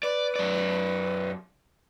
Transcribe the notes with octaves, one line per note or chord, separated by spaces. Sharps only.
B4 D5
F#2 D5